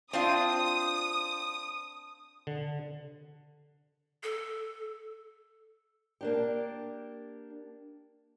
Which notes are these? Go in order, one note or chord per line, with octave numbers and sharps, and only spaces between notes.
C4 D4 F4 D#6
D3
A4
A#3 D4 G4